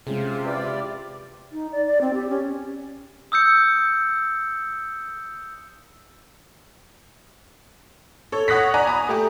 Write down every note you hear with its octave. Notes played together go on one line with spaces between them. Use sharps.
C3 G#3 C#4 F4 G#4
E4 G4 B4 D5
D#4
D5
D5
C4
G4
C#4
D#6 E6 G6 C#7
A4 C#5
C#5 F#5 D#6 F#6 A#6 B6
D5 G#5 A#5
G#5 A#5 B5 D#6
A3 G4